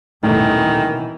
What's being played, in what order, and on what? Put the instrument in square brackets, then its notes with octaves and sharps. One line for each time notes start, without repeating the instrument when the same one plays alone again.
[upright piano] D#1 A3 [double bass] B2 E3 [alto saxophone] D#3